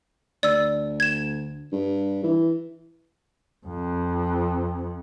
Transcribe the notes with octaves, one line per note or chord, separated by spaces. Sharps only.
D2 D5 E6
G#6 E7
G2
E3
F2